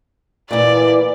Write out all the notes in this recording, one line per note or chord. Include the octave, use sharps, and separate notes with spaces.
A#2 E3 D5